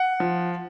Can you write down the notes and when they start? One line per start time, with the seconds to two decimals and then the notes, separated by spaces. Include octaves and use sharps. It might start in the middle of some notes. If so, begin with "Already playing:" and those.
Already playing: F#5
0.20 F3